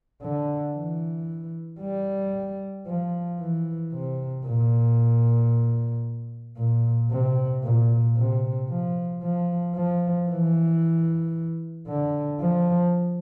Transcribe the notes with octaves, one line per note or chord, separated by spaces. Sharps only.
D3
E3
G3
F3
E3
C3
A#2
A#2
C3
A#2
C3
F3
F3
F3
E3
D3
F3